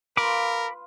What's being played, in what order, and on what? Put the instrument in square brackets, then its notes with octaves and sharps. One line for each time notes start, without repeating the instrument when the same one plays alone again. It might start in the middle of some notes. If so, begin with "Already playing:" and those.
[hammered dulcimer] F4 B4 [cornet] A#4 [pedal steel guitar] B5 D6